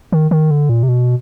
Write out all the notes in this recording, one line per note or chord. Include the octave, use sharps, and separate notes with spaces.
D#3
D#3
D3
A#2
C3
B2